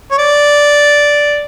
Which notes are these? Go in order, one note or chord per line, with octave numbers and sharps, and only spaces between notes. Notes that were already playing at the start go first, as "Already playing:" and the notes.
C#5
D5